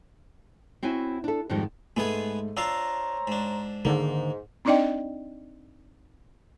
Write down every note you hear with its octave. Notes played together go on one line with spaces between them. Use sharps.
C4 E4 F#4 C#5 G#5
D4 A4
F2 G#2 D#3 F3 G3
G#2 G#3 A3 B3 G#4
D4 F4 C5 C#5 F5 A#5 E6
G#2 D4
G#2 D3 D#3 A#3
C4 D4 D#4 D5 D#5 G5